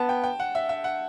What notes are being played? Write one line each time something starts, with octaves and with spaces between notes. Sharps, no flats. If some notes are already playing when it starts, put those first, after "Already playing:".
Already playing: B3 A5
G5
G5
F#5
E5
E5
F#5